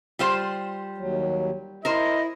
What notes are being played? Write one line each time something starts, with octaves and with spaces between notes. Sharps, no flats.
G3 F4 C5
D#2 F#3
E4 A#4 C5 D#5